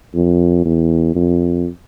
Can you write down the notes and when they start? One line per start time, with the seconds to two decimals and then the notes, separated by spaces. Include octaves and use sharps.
0.15 F2
0.65 E2
1.15 F2